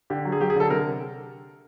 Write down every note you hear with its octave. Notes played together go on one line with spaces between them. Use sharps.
D3 G4
F#3
G#4
F#3 G4
G#4
D3 A4
C3 A#4